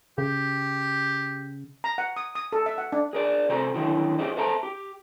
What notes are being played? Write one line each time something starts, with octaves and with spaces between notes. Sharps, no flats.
C#3 G4
A#5
F#5
D#6
D#6
A4
E5
F#5
D4
G#4 A#4 D5
C3 F#4 A4 C5 A#5
D3 D#3 F#3 E4
F4 G4 G#4 C5 D#5
A4 C5 E5 A5 A#5
G4